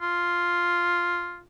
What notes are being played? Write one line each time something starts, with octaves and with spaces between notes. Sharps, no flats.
F4